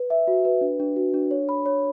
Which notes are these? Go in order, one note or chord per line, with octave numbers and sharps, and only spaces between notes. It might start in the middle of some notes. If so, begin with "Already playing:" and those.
Already playing: B4
E5
F#4
B4
D4
D4
F#4
D4
C#5
B5
C#5